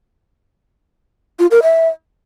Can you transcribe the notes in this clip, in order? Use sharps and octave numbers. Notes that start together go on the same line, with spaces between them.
F4
A#4
E5